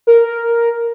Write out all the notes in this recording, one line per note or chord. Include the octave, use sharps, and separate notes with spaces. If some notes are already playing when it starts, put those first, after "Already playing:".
A#4